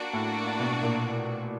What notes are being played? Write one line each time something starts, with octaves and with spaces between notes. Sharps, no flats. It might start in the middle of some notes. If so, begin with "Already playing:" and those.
Already playing: A#3 D4 F#4
A2
B2
A#2